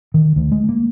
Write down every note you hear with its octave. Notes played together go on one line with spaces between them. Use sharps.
D#3
D2
G#3
A#3